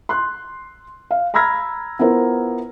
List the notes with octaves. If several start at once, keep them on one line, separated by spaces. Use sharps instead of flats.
C6 F#6
F5
A#5 B5 E6 F6 G#6 A#6
B3 E4 F4 A#4 C5